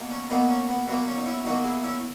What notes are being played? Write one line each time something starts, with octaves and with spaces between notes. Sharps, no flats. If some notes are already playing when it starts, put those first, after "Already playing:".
Already playing: B2 F#3 A#3
C#4
B2 F#3 A#3 B3 D#4
C#4
B3
B2 F#3 A#3 B3
C#4
D#4
C#4 E4
B2 F#3 A#3 D#4 F#4
E4 G#4
C#4 E4